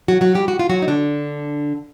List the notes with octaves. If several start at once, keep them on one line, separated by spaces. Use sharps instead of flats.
F#3 F#4
F#3 F#4
G3 G4
F#4
F4
F#3 F#4
D#4
D3 D4